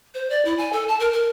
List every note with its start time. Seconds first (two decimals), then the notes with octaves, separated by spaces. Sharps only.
0.14 C5
0.30 D5
0.45 E4
0.58 G#5
0.73 A4
0.88 A5
1.00 A#4
1.13 A#4